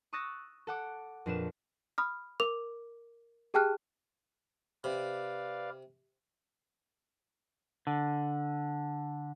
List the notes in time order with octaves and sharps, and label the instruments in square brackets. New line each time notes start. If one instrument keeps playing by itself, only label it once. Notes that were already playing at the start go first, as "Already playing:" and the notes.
[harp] C#6 D#6 E6 F#6 A6 A#6
A4 F#5 D6
F2 A#2 D4 G#4 B4 E7
[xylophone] B5 D#6 F6
A#4 D6 F7
G4 G#4 G5 A5 F6 F#6
[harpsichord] C3 [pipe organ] B4 D5 F5
[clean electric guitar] D3